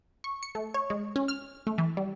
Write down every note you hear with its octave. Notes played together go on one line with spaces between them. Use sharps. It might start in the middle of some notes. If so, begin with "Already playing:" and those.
C#6
C#7
A3
C#5
G#3
C#4
F6
A3
E3
G3